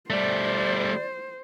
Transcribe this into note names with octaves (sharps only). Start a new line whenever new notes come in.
G3 A3 C5 D5